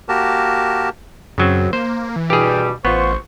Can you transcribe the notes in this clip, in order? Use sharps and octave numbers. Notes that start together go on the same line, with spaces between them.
A#3 F#4 G4 A#4 A5
F#2 C#3 F#3 C4
A#3 C5
E3
G2 B2 G3 G4 G#4
A1 B3 F4 C5 C#6